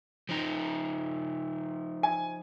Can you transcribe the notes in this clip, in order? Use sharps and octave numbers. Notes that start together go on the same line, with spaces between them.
F3 D#4
G#5